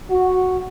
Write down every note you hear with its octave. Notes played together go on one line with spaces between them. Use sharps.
F#4